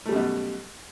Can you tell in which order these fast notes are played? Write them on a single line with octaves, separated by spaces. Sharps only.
A3 G3 F#2 B2